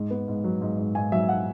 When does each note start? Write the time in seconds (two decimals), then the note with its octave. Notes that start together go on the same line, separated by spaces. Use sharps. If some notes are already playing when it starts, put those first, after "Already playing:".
Already playing: G#2
0.10 B3
0.28 G#2
0.44 F#3
0.61 G#2
0.78 G#2
0.95 G#2 G#5
1.12 F#3 E5
1.29 F#5